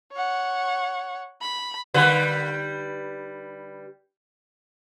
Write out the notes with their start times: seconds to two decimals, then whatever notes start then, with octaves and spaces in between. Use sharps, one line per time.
0.13 C#5 F#5
1.41 B5
1.94 D3 G3 B4